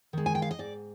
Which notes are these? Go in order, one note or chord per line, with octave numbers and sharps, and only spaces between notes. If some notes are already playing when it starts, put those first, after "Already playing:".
D#3 G#3
G#5
G5
F5
D#5
G#2 D5